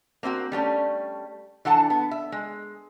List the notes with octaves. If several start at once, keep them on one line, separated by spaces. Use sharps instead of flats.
A#3 C4 E4 F#4
G3 A3 A#3 C#4
E3 D4 A4 F#5 A5
B3
E5
G#3